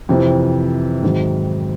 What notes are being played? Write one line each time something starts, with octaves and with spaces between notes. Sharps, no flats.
F2 C3 E3
G#2 D#3 F#3